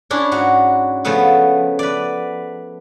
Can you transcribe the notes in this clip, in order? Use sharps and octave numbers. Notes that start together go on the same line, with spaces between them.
C#4 D4 E4
G#2 F#4
C#3 F3 A3 B3 A4 B4
B4 D5